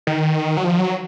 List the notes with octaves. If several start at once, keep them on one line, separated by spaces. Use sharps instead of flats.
D#3
F#3
F3
F#3